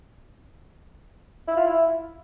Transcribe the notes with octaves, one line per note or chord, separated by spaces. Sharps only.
E4
F4
E4